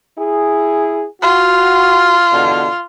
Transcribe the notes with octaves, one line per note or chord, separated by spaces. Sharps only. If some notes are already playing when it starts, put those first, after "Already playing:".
E4 G#4
F4 F#4
E2 B2 D3